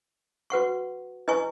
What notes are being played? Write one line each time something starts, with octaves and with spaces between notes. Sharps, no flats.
F#4 B4 F#5 C#6
E4 B4 D#5 G#5 C#6